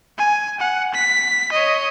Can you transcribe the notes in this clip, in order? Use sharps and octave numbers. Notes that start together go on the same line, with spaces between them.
G#5
F#5
B6
C#5 D#5